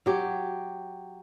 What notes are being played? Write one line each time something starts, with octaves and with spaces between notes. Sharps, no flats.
F#3 G4